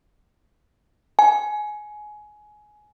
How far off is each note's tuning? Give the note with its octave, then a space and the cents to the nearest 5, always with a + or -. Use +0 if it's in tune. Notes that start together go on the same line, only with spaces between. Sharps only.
G#5 +20